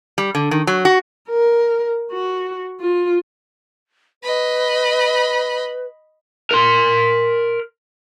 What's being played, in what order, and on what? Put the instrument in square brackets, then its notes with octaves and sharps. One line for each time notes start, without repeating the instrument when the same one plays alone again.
[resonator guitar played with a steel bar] G3
D3
D#3
F#3
F#4
[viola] A#4
F#4
F4
[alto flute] B4 [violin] D#5 B5
[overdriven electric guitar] A#4 C6